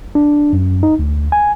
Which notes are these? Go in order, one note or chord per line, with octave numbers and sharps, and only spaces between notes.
D4
F#2
D#4
D2
G#5